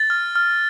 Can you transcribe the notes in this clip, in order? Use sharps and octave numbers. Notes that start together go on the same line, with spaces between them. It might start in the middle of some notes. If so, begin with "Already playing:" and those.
Already playing: A6
F6
F6